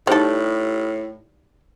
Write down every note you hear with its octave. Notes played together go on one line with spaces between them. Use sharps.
A2 G3 D#4 A4 C5